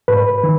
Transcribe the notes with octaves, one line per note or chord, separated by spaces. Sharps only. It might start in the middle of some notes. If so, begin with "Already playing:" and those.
G#2 B4
D#3